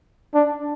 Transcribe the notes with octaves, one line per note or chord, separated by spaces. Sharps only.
D4